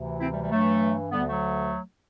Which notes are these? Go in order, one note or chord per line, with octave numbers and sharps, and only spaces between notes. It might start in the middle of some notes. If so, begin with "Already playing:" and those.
Already playing: D2 C3 E3
C4 E4
G3
G3
G2 E3 F#3 A3
D2 D3 G3 B3
G3
F#3 A3